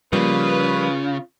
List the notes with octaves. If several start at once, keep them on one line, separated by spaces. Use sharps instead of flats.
C#3 F3 G3 A#3 F4 B4